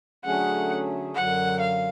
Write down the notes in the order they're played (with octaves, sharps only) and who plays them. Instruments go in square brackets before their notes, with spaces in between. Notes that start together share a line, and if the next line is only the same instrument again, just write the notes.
[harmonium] D3 F#3 A3 C#4 G#4 [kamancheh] F#5
[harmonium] F#2 D3 F#3 [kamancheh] F#5
[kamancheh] F5